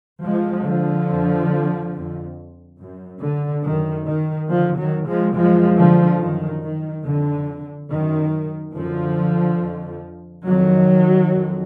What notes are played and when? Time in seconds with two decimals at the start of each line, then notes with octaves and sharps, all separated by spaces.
0.23 F2 F3 G#3
0.65 D3 F3
1.09 F2
1.94 F2
2.79 F#2
3.22 D3
3.64 F#2 D#3
4.07 D#3
4.49 F2 D3 F3
4.77 D#3 F#3
5.06 F3 G#3
5.34 F#2 F3 G#3
5.77 D3 F3
6.19 F#2 D#3
6.62 D#3
7.05 F2 D3
7.91 F#2 D#3
8.75 F#2 D3 F3
9.61 F2
10.45 F2 D#3 F#3
11.32 F2